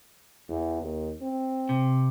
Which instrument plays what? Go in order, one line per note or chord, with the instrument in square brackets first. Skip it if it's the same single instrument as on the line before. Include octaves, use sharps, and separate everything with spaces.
[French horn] E2
D#2
C4
[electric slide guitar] C3